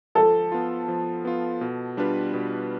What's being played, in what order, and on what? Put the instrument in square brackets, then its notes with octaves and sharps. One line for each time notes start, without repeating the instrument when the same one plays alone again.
[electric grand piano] F3 [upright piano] A4
[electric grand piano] B3 F4
F3
B3 F4
B2
G3 D4 F4 B4
B2